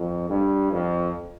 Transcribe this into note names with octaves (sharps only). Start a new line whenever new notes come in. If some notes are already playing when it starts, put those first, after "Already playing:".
Already playing: F2
G2
F2